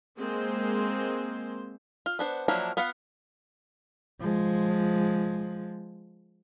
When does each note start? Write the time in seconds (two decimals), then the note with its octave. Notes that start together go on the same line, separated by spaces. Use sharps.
0.18 G#3 A#3 C4 C5
2.06 F4
2.19 B3 D4 C5
2.48 F3 F#3 A#3 D4 E4
2.77 B3 F4 B4 F5 F#5
4.20 F3 G#3